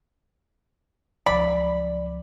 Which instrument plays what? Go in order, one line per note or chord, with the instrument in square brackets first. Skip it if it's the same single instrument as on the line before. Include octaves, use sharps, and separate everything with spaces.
[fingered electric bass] C#2 F3 F#3 [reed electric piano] D5 [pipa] B5